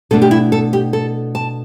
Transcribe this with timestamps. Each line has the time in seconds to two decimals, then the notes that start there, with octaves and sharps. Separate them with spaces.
0.11 B2 A3 D4 A4
0.22 G4
0.31 E4
0.52 A4
0.73 G4
0.93 A4
1.35 A5